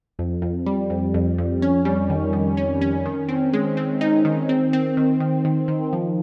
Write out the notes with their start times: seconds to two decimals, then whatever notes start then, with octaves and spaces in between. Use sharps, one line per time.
0.19 F2
0.42 F2
0.66 G3
0.90 F2
1.14 F2
1.38 F2
1.62 C#4
1.85 G3
2.10 D#3
2.33 D#3
2.57 C#4
2.82 C#4
3.06 D#3
3.29 C4
3.54 G#3
3.77 C4
4.01 D#4
4.25 D#3
4.49 C4
4.73 C4
4.97 D#3
5.20 D#3
5.45 D#3
5.68 D#3
5.93 F3